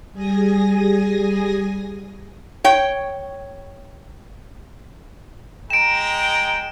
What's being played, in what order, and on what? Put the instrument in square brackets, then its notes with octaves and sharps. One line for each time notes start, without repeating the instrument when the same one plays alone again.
[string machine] G3 G#4 G#5 D#6 A#6
[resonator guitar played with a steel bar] C#5 G5
[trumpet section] G#3 G5 A#5 [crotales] D7 E7